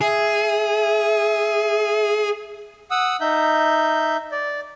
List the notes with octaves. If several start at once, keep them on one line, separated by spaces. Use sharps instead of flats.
G#4 E5
F#5 D#6 E6
D#4 E5 G6
D5